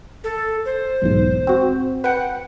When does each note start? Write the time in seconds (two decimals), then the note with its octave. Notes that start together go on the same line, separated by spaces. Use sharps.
0.24 A4
0.65 C5
1.02 B1 E2 G#2
1.47 C4 F#4
2.04 B4 F#5 G5